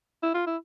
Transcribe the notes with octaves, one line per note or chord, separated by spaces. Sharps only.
E4
F4
E4